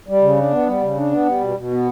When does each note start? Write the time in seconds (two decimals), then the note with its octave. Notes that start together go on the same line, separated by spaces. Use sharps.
0.08 G3
0.22 C#3
0.38 D4
0.52 B3
0.66 G3
0.82 C#3
0.97 D4
1.12 B3
1.26 G3
1.41 B2
1.57 B2
1.71 B3